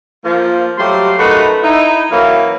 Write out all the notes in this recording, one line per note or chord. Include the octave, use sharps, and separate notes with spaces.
F3 A#3 F4
F#3 G3 A3 G4 F5 C6
F#2 A3 D#4 F#4 B4 B5
D#4 E4
F#2 E3 F#3 A#3 E4 A#4